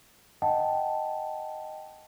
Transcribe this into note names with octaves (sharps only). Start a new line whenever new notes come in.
D#5 F#5 G5 A5